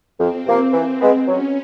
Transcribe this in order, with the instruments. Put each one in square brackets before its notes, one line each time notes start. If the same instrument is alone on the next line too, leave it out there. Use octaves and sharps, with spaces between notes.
[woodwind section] F2 [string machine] C4
[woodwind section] C3 F3 A#3
E3
G#3 B3
[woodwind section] F#3 [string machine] C#4